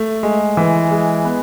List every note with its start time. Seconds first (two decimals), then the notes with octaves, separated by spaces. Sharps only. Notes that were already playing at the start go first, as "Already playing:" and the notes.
Already playing: A3
0.23 G#3
0.57 E3
0.91 G#3
1.25 B3